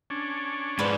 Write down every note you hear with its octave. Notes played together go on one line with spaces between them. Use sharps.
C#4 D4
G#2 F3 B4 D5